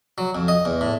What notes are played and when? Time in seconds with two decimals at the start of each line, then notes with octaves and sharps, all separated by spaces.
0.18 F#3
0.35 F2
0.48 D#5
0.65 E2
0.81 A2